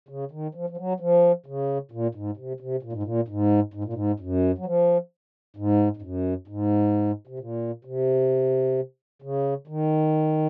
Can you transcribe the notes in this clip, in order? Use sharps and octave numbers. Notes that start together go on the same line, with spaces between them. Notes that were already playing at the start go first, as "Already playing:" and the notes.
C#3
D#3
F3
F3
F#3
F3
C#3
A#2
G#2
C3
C3
A#2
G#2
A#2
G#2
G#2
A#2
G#2
F#2
F#3
F3
G#2
G#2
F#2
G#2
C3
A#2
C3
C#3
D#3